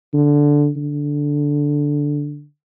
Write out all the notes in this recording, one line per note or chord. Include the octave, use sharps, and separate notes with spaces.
D3
D3